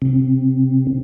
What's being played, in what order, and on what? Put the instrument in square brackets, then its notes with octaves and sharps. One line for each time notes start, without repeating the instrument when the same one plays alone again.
[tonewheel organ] C3